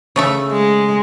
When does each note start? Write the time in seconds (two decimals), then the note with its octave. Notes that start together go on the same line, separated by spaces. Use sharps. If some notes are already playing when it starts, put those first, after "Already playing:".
0.16 C#3 A3 E5
0.52 G#3